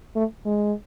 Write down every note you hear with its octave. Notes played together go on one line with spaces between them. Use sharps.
A3
G#3